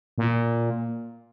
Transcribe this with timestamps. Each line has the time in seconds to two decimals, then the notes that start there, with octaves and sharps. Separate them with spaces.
0.18 A#2